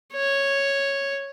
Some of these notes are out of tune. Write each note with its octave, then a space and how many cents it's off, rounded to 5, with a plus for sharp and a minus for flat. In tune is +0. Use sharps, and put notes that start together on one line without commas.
C#5 -5